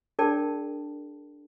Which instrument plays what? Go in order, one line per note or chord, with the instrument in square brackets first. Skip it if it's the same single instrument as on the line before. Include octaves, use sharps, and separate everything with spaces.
[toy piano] D4 G#4 A#4 D5 G5 A5